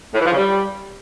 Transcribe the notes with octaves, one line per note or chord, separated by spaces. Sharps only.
A2
E3
F3
C#3
G3